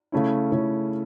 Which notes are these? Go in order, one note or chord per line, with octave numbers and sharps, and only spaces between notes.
C#3 A3 C#4 E4
C#3 A3 C#4 E4